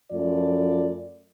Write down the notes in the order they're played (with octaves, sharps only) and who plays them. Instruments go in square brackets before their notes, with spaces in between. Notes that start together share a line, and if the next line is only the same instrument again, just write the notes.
[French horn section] F#2 F3 A3 F4 D5